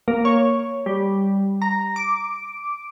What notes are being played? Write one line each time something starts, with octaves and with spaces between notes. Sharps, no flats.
A#3
C#5
G3
A#5
D6